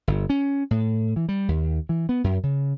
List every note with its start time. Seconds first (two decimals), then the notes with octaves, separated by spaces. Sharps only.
0.08 G1
0.30 C#4
0.71 A2
1.16 E3
1.29 G3
1.48 D#2
1.89 E3
2.09 B3
2.24 F#2
2.43 C#3